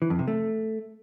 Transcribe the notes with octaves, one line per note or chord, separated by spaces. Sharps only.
E3
F2
C3
A3